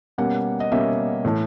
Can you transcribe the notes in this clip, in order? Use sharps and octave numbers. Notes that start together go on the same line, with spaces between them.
B2 G3 A#3 C#4 F#5
D#5
B2 G3 A#3 C#4 E5
A2 E3 A3